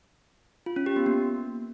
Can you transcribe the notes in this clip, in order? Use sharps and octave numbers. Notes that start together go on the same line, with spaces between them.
F4
C#4
G4
B3
A#3